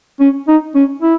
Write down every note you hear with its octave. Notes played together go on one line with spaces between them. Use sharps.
C#4
D#4
C#4
E4